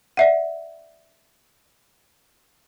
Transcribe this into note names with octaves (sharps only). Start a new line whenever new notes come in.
D5 E5 F#5